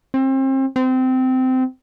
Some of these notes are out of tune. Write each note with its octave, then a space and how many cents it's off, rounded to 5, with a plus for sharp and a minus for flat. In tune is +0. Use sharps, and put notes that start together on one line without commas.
C4 +35
C4 -20